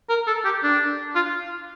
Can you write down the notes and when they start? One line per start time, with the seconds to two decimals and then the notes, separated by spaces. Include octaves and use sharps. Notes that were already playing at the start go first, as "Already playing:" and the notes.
0.09 A#4
0.27 A4
0.45 G4
0.63 D4
1.15 F4